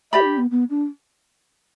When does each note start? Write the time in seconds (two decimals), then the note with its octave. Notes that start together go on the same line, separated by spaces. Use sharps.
0.12 G4 D5 E5 B5
0.21 E4
0.25 D4
0.38 B3
0.51 B3
0.70 D4